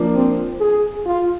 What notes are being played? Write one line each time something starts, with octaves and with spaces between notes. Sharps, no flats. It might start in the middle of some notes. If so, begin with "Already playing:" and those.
Already playing: F3 A#3 D4
C4
G#4
F4